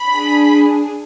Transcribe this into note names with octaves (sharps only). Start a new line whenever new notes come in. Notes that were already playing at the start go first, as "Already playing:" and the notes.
Already playing: B5
D4 G#4